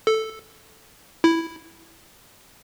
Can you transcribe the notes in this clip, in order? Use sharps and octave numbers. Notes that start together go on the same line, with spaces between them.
A4
E4